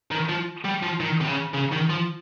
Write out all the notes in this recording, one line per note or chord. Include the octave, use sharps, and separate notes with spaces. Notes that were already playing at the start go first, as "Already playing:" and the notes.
D#3
F3
G3
F3
D#3
C3
C#3
C#3
D#3
F3